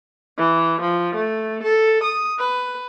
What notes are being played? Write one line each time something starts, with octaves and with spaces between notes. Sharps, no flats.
E3
F3
A3
A4
D#6
B4